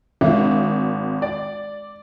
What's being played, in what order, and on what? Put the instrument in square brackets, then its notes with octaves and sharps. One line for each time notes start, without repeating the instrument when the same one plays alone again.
[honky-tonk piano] G#1 [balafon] G#3 D4 E5
[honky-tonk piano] D5